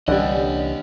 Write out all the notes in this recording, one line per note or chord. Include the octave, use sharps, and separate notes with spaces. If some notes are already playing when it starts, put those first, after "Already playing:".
C2 D3 E3 G3 C#4 G4 D5 D#5